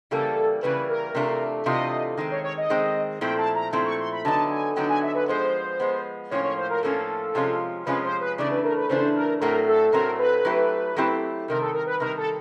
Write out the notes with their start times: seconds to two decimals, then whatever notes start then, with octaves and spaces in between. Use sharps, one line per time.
0.11 C#3 E3 G3 A#3 A4
0.62 C#3 E3 G3 A#3 B4
0.89 A#4
1.15 C3 E3 A3 D4 F4
1.66 C3 E3 A3 D4 F4 D#5
2.17 D#3 G#3 C4
2.31 C#5
2.44 C#5
2.57 D#5
2.70 D#3 G#3 C4
3.21 A#2 F3 A3 C4 E4 G5
3.38 A5
3.55 A#5
3.73 A#2 F3 A3 C4 E4 C6
3.85 C#6
3.99 C6
4.12 B5
4.25 D3 F#3 B3 D#4 A5
4.51 G#5
4.76 D3 F#3 B3 D#4 G5
4.89 G#5
5.03 E5
5.15 B4
5.28 F3 G#3 B3 C5
5.80 F3 G#3 B3
6.31 A2 F3 A#3 C#4 F4 C#5
6.44 C#5
6.58 C5
6.70 A#4
6.83 A2 F3 A#3 C#4 F4 A4
7.35 C3 F3 G#3 C#4 F4
7.86 C3 F3 G#3 C#4 F4 B4
8.04 C5
8.21 B4
8.38 C#3 E3 A3 D4 D5
8.50 B4
8.64 A#4
8.77 B4
8.90 C#3 E3 A3 D4 C5
9.16 A#4
9.41 A2 F#3 A3 C4 A#4
9.68 A4
9.92 A2 F#3 A3 C4 A#4
10.19 B4
10.45 F#3 A3 C4 E4 G4
10.96 F#3 A3 C4 E4 G4
11.48 C3 D#3 G3 A#4
11.61 A4
11.73 A#4
11.86 B4
12.00 C3 D#3 G3 A#4
12.17 A4